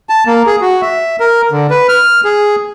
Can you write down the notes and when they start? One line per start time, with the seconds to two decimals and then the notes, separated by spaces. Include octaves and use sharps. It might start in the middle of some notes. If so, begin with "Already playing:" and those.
0.09 A5
0.27 A#3
0.46 G#4
0.61 F#4
0.82 E5
1.20 A#4
1.52 D3
1.70 B4
1.89 F6
2.24 G#4